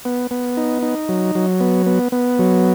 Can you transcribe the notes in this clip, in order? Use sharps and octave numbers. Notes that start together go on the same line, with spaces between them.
B3
B3
D#4
D#4
F#3
F#3
B3
B3
B3
F#3